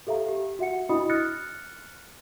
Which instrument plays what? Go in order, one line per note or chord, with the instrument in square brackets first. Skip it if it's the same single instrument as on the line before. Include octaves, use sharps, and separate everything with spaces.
[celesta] G4 A4 E5 F5 A#5
G4
F#4 E5 F#5 C#7
D4 E4 F#4 D#5 B5 D#6
F6 F#6 A6 A#6 C#7